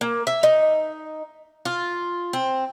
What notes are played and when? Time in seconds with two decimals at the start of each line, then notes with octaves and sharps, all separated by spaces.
0.01 A#3
0.27 E5
0.43 D#4
1.65 F4
2.33 C4